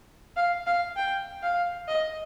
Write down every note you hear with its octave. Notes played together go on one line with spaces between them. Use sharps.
F5
F5
G5
F5
D#5